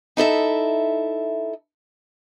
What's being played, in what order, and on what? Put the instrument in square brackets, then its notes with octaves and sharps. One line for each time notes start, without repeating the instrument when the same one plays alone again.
[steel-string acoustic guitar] D#4 E4 A4 E5